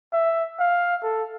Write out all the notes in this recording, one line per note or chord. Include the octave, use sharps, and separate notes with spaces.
E5
F5
A4